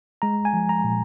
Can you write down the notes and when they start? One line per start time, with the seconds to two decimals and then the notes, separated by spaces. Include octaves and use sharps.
0.22 G#3 A#5
0.45 G#5
0.53 F3
0.69 A#5
0.84 A#2